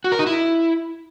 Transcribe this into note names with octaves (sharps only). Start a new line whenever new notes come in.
F#4
A#4
D#4
E4